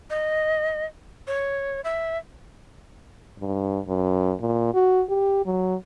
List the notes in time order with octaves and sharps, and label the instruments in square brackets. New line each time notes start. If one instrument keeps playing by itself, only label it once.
[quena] D#5
C#5
E5
[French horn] G2
F#2
A#2
F#4
G4
F#3